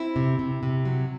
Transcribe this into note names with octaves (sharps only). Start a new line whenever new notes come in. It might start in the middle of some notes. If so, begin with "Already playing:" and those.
Already playing: C4 E4
C3
C3
C3
F#3